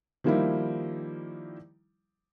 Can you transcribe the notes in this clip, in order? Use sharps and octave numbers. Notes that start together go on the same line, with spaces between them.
D#3 F3 G3 A#3 D#4 E4